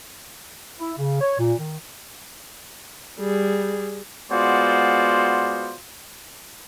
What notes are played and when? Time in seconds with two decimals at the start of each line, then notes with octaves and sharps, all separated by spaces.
0.79 E4
0.98 C#3
1.21 C#5
1.39 A#2
1.59 D#3
3.19 G3 G#4
4.32 G#3 B3 F4 F#4 C5 D5